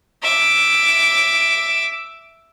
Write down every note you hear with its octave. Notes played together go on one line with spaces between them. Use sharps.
E5 D6